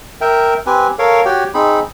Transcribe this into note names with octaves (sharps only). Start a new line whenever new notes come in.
A#4 E5 G5
C4 G4 B4 G#5
A4 A#4 C#5 F5
F#4 G4 C#5 G5
C4 D#4 G#4 B5